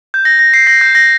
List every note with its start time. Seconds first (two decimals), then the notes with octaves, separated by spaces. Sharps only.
0.14 G6
0.25 A#6
0.39 A#6
0.54 C7
0.67 A#6
0.81 G6
0.95 A#6